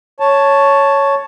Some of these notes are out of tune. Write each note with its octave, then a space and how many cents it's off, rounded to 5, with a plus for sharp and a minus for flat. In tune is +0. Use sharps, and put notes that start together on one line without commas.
C#5 +0 A5 +0